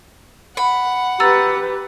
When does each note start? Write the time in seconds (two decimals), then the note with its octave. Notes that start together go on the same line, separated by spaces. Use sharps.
0.57 F#5 B5
1.20 G4 B4 A#5 E6 A6